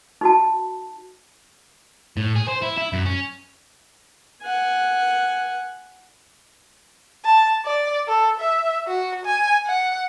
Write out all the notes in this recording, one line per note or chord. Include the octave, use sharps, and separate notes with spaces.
D#4 F#4 A5
A2
G#4
C5
E4
E4
F#2
C#4
F#5 G#5
A5
D5
A4
E5
F#4
G#5
F#5